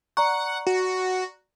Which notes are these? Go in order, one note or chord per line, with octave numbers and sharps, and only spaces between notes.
D5 F#5 A#5 C#6
F#4